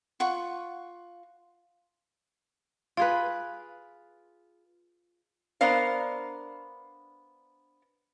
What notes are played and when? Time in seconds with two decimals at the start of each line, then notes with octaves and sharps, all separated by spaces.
0.20 F4 F#5 C#6
2.97 F4 G#4 B4 F5
5.61 B3 D4 A#4 C5 F5